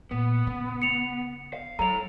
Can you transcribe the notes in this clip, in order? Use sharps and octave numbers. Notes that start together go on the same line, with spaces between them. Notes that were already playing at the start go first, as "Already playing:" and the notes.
A#2 B3
C#3
C#7 F7
F5
F#3 A4 C#5 A#5 F7